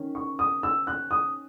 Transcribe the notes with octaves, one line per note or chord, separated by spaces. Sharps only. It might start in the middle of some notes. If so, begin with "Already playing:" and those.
Already playing: D#3 C#4
C#6
D#6
E6
F#6
D#6